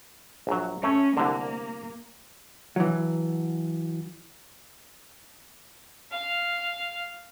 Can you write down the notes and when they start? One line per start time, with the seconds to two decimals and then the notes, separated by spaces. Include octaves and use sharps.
0.47 A#1 F#3
0.83 A3 C#4 C#5
1.17 C2 D3 A#3
2.76 E3 F#3
6.11 F5